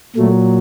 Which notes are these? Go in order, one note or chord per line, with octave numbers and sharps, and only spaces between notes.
A#2 F#3 A3